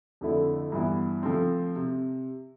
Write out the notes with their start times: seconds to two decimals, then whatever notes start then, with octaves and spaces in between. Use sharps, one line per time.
0.21 F2 D3 A3 E4 A4
0.72 G2 E3 B3 E4
1.23 F3 A3 C4
1.76 C3